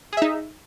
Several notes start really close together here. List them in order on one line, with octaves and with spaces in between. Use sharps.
G#4 E5 D#4